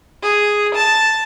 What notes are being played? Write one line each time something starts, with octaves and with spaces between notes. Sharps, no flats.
G#4
A5